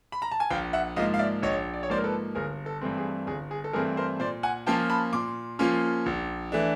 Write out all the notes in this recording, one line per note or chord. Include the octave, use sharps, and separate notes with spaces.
B5
A#5
A5
G#5
A#1 F5 G5
E5 F#5
G#2 F3 A#3 D#5 F5
F5
D5 E5
A#1 C#5 D#5
D5
C#5
G#2 F3 A#3 C5 D5
A#4
A4 B4
G1 G#4 A#4
A4
G2 E3 A3 C4
G#4
G1 G#4
G#4
A4
G2 E3 A3 C4 G#4 A#4
A#4 C5
A#2 C5 D5
F#5 G#5
F3 A#3 C#4 F4 G5 A5
A5 B5
A#2 C6 D6
F3 A#3 C#4 F4
A#1
E3 A3 D4